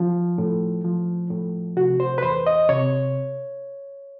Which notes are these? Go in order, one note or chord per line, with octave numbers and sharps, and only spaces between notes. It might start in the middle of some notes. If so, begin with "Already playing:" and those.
Already playing: F3
A2
F3
A2
C3 F#4
C5
B4
E2 C5
D#5
C3 C#5